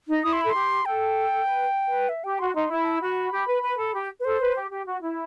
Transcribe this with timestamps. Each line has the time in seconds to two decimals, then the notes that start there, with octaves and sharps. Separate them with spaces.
0.08 D#4
0.23 E4 D#6
0.33 C6
0.42 A4 B5
0.50 G4 C6
0.86 A4 G5
1.46 B4
1.88 B4
2.09 E5
2.24 G4 G5
2.39 F#4 C6
2.55 D#4 C6
2.70 E4 B5
2.85 A5
2.98 F#4 B5
3.32 G4
3.47 B4
3.62 B4
3.78 A4
3.94 G4
4.20 B4
4.24 A4 C5
4.40 B4
4.55 G4
4.71 G4
4.87 F#4
5.02 E4